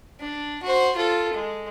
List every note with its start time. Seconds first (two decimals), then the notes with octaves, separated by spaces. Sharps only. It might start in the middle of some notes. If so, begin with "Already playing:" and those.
0.20 D4
0.63 F#4 C5
0.96 F4 A4
1.33 G#3